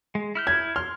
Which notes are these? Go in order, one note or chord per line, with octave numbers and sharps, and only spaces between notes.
G#3
E4 F6 G6
G#6
C6 F6